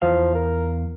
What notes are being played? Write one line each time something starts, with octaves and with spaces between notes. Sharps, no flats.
E2 F3 F5
A#4